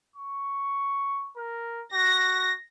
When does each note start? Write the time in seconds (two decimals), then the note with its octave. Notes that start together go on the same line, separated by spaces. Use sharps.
0.16 C#6
1.37 A#4
1.93 F#4 A#6